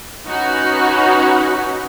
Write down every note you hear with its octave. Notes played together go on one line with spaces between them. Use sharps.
C#4 D#4 F#4 B4